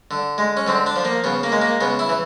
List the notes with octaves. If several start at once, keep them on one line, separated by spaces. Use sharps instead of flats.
D3
G#3
C#4
D3 C4
D4
F3
A#3
C#3 B3
A#3
G#3
A#3
C#3 B3
E4
E3